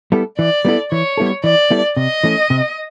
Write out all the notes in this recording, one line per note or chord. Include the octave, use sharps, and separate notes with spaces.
G3 B3 E4 A4
E3 D5
G3 B3 E4 A4
E3 C#5
G3 B3 E4 A4
E3 D5
G3 B3 E4 A4
C3 D#5
E3 A3 C#4
C3